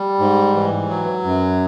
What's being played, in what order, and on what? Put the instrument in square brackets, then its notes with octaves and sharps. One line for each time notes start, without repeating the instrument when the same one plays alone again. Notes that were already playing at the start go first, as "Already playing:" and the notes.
Already playing: [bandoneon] G3
G#2
E3
F#3
F#2